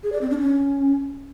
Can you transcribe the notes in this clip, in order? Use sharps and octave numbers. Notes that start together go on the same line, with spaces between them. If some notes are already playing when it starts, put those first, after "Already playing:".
G#4
D5
C4
D4
C#4